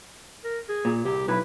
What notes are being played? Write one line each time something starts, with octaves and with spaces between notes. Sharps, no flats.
A#4
G#4
A#2
C2 G4
B1 E4 B4 B5